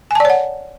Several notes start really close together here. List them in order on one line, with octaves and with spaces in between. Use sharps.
G#5 A5 D5 C#5 F#5